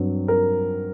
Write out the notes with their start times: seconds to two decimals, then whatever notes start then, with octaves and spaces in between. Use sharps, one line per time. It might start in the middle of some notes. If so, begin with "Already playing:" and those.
Already playing: G2 F#3 C4
0.28 A#4